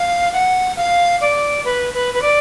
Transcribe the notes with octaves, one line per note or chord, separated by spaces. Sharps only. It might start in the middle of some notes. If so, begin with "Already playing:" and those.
Already playing: F5
F#5
F5
D5
B4
B4
B4
D5